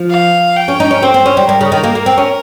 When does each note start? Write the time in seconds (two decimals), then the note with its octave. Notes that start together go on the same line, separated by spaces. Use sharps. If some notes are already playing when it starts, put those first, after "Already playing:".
Already playing: F3
0.10 F5
0.56 G5
0.68 C#4
0.80 D#4
0.91 C#4
1.02 C4 C5
1.14 C4
1.26 C#4
1.37 G3
1.48 G3 A#4
1.61 C#3
1.72 D#3
1.84 A#3
1.95 A#3
2.06 C4
2.18 C#4